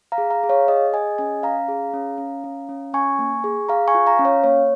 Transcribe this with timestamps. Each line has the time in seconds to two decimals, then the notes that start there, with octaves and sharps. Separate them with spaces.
0.12 F5 A#5
0.18 G#4
0.30 F5 A#5
0.43 G#4
0.49 C#5 F5
0.68 G#4 D#5
0.93 G#4 D#5 G#5
1.18 C#4 D#5 G#5
1.43 C#4 F5 A#5
1.68 G#4
1.94 C#4
2.18 C#4
2.44 C#4
2.69 C#4
2.93 C#4 G#5 C#6
3.19 A#3
3.44 G#4
3.69 G#4 F5 A#5
3.88 G#5 C#6
3.95 F4
4.06 F5 A#5
4.19 C#4
4.25 C#5 F5
4.44 A#3 C#5